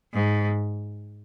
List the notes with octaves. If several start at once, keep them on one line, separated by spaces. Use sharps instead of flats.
G#2